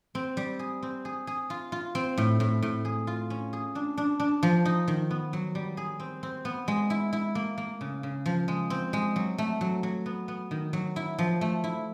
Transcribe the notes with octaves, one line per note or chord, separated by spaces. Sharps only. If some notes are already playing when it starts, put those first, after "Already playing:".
C4
G3
G#4
C4
G#4
G#4
F4
F4
C4
A2
A2
A2
G#4
F4
C#4
G#4
D4
D4
D4
F3
D#4
D#3
B3
F#3
G3
G#4
C4
C4
B3
G#3
E4
E4
A#3
A#3
C#3
C#3
F3
G#3
C4
G#3
F#3
A3
F#3
F#3
B3
B3
D#3
F#3
E4
F3
A3
E4